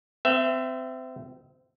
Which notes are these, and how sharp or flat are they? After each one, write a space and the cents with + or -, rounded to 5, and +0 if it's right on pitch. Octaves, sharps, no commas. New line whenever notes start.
C4 -30 E5 +15